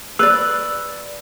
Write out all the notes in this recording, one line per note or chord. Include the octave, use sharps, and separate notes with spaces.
B4 D5 E6